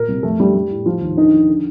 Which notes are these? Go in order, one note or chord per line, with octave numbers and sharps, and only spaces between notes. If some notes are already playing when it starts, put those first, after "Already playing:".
Already playing: A#2 A#4
C2
F2 A3 A4
D3 G3 G4
G3
A2
F3 F4
D#2
D3 D#3 D#4
F3
D3